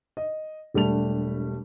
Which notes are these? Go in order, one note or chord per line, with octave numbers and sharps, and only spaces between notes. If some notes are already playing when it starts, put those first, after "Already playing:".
D#5
E1 G3 A3 D4 F7